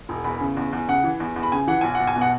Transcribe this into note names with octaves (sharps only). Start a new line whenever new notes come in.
E1
E2 B5
C#3
E2
E2
C#3 F#5
E3
E2
E2
B5
C#3 G#5
E3 F#5
B1 G#5
B1 F#5
G#5
B2
F#5